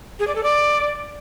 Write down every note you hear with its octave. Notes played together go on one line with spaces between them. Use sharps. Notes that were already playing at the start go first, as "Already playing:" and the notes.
G#4
D5
A4
D5